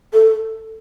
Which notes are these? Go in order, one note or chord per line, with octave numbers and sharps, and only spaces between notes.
A4